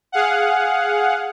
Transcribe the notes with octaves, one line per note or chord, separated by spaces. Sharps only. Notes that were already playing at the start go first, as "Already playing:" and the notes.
G#4 F5 F#5